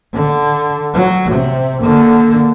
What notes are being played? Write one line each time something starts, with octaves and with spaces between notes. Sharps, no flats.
D3
F#3
C3
D3 A#3